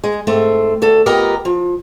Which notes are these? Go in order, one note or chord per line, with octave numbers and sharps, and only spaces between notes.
G#3
G#2 A3 C4
D2 A4
F2 B3 G4 A#4 D#5 A#5
F3